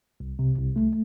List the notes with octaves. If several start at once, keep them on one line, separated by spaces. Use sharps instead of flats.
C2
C3
C2
A3